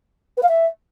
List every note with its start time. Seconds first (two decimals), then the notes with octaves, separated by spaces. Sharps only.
0.37 B4
0.43 F5
0.48 E5